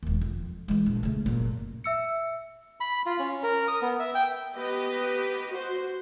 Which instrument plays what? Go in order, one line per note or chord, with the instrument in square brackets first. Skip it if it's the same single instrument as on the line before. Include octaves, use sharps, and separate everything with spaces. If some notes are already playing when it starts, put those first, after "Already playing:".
[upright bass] E1 D#2
F2
E3 G#3
A#1
C#3 A3
F#1 A#2
[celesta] E5 E6 C#7
[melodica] B5
F4
C#4
A#4
D#6
B3
E5
G5
[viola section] B3 G4 B4 D#5
F#4 C5